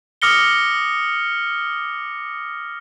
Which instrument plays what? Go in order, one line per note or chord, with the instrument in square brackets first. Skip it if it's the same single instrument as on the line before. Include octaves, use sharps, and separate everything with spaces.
[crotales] D6 D#6 F6 A#6 C#7 G7